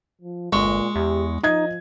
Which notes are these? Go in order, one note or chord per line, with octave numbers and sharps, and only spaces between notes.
F3
G1 A#2 G#3 C#6
E2 G4
F3 D#4 D#5 G#6